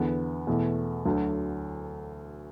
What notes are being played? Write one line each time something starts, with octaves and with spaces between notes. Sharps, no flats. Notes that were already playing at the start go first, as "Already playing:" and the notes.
Already playing: E2 D3 B3 E4 A4
E2 B2 A3
D2 D3 F#3